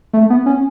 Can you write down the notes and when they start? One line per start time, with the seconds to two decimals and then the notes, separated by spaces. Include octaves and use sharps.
0.13 A3
0.30 B3
0.46 C#4